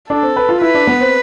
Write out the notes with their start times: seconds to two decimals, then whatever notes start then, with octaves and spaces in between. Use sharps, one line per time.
0.10 D4 A4
0.23 C4
0.36 B4
0.49 F4
0.61 E4 B4
0.74 D4
0.87 B3
1.00 C4